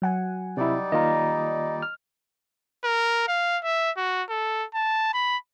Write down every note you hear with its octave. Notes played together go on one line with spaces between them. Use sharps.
F#3 F#5 G#5
C3 G3 D#4 E4 D5
D#3 A#3 F4 D#5 A#5
F6
A#4
F5
E5
F#4
A4
A5
B5